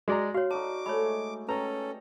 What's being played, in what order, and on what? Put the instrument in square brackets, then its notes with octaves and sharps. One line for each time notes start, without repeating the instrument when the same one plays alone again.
[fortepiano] G#3 D5 A#5 [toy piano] F#4
[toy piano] F#4 C#5 [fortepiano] F5
[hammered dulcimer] D#4 F#4 D5 [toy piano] A5 [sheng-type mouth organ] D6
[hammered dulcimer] G#3 A3 [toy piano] C#5 B5
[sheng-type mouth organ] C#4 A4 [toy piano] B4 [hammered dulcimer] G5 [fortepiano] A#5